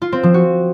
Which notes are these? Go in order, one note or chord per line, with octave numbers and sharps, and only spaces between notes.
F4
C4
F3
F#4